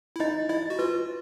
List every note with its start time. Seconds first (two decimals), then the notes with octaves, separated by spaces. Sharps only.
0.16 E4
0.20 D#4 D#5
0.49 E4 D#5
0.70 F#4
0.79 F4 B4